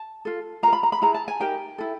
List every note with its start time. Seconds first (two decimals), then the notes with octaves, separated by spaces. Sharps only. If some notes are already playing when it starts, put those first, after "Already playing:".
Already playing: A5
0.25 F4 A4
0.63 F4 A#5
0.67 A#4
0.73 B5
0.83 A#5
0.92 B5
1.02 E4 G#4 B4 A#5
1.14 A5
1.28 G#5
1.40 D#4 G4 A#4 G5
1.78 E4 A4